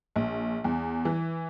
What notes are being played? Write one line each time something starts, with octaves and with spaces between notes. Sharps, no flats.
A#1
E2
E3